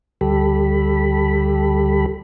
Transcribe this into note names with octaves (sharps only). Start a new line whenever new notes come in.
D2 G3 G4 A4 B5